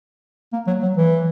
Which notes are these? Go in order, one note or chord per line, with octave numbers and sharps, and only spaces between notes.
A#3
F#3
F#3
E3